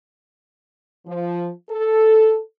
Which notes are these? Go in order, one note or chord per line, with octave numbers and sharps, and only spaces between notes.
F3
A4